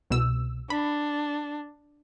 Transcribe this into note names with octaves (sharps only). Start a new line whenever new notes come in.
C2 B2 E6
D4 B5